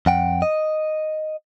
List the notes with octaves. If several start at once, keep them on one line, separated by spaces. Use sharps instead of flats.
F2 F#5 G5
D#5